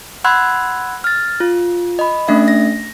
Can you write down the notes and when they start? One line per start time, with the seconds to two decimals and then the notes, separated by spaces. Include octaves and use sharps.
0.24 F#5 B5 C6 E6 F#6 G#6
1.04 F6 A6
1.40 F4
1.99 D#5 B5
2.28 A3 C#4 D4 E5
2.48 A#6